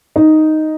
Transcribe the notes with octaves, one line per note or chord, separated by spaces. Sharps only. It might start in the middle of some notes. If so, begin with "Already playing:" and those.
D#4